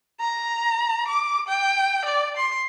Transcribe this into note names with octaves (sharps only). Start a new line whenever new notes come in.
A#5
D6
G5
D5
C6